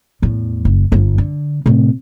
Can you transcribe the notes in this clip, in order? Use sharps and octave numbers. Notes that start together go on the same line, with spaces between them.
E2 A2
F#1
G1 G2
D3
A2 C3